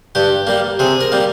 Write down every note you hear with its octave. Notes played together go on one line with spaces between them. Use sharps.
G2 G4
G3 A#3
C3 G#4
A#4
G3 A#3